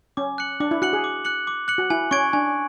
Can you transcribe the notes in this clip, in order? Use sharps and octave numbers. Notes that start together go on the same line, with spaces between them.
C#4 D6
F#6 C#7 F#7
D4 D6
E4
F#4 F#6 C#7 F#7
G#4
D6
F#6 C#7 F#7
D6
F#6 C#7 F#7
F#4
E4 G#5
C#4 C#6 G#6 D7
D4 G#5